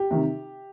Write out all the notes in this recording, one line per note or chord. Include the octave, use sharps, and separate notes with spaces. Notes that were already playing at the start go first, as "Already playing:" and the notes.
Already playing: G4
C3 D#3